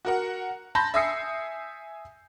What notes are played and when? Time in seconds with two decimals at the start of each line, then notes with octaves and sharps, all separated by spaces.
0.05 F#4 A#4 F#5
0.75 A5 B5 C6 G6 A#6
0.94 E5 G#5 D#6 E6 C7 C#7